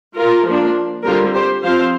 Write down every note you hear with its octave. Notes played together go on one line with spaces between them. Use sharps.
F4 A#4
F3 A#3 D4
D3 G3 C4 F4 A#4
G4 C5
F3 C4 C5 F5